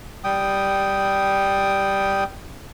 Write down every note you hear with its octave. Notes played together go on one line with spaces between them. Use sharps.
G3 G5 D#6